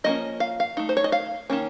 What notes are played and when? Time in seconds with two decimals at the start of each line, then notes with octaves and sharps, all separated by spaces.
0.04 F3 A#3 C#4 D#5
0.40 F5
0.60 F5
0.77 A3 D#4
0.89 C5
0.97 C#5
1.04 D#5
1.12 F5
1.50 D#3 A#3 C#4